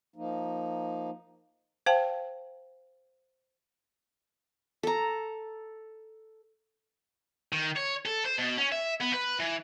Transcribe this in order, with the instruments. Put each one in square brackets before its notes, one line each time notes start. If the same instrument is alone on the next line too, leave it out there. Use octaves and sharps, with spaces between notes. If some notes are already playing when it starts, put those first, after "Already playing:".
[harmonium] F3 A#3 D#4
[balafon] C5 F5 G5 A5
[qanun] A4 A#5
[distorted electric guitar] D#3
C#5
A4
C5
B2
C#4
E5
B3
B4
E3